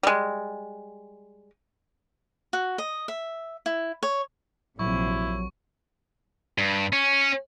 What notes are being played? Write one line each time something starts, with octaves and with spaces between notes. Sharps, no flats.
G3 G#3
F#4
D#5
E5
E4
C#5
A#1 C3 F3 F#3 E4 C#6
G2
C#4